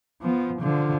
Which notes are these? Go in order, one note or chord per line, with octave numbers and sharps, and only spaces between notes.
F3 B3
D3 F3